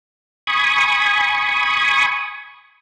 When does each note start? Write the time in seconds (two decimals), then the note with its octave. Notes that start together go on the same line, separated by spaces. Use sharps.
0.47 G#5 B5 C#6 D#6